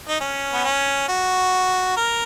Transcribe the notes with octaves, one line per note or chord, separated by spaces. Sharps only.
D#4
C#4
B3
C#4
F#4
A#4